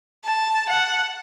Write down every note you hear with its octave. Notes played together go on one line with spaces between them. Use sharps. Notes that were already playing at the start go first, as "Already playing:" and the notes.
A5
F#5